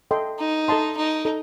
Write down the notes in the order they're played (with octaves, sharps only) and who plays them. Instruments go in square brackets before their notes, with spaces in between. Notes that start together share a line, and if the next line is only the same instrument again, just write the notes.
[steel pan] A4 D#5 G5 C6
[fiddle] D#4
[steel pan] A4 D#5 A5 C6
[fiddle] D#4
[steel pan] A4